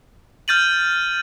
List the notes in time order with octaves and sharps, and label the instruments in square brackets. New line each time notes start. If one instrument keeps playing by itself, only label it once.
[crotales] F6 G6 A6 D#7 F#7